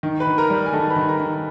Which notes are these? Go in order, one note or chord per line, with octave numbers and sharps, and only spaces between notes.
D#3
B4 B5
D#3
A#4 A#5
G3
G#5
D#3 A4 A5
B4 B5
D#3
A#4 A#5
D#3